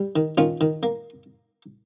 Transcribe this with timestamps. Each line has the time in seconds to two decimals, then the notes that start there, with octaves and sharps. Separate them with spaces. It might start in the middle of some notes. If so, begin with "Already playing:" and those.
Already playing: G3
0.16 D#3
0.38 D#3 C#4 F4
0.61 D#3
0.83 A#3